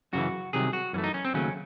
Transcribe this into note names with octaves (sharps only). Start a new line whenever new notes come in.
F#2 C#3 E3 F#4
C2 C3 D#3 F#3 G#4
F#4
F#2 E3 A3 C#4
D#4
C#4
C4
D#2 C#3 F#3 A3 C#4